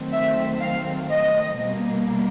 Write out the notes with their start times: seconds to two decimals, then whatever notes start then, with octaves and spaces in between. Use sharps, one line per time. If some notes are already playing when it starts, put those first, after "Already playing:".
Already playing: D#3 F#3 A3 C4
0.12 E5
0.61 F5
1.11 D#5
1.60 B2 G3 A#3